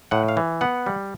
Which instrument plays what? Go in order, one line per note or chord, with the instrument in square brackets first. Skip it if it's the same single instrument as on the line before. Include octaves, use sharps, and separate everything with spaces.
[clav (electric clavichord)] A2 F#5
F5
E3
B3 F#5
G3